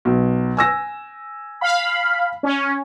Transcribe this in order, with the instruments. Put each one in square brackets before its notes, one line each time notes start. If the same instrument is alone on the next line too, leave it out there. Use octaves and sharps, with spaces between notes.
[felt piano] B1
G#5 E6 A#6
[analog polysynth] F5 B5
C#4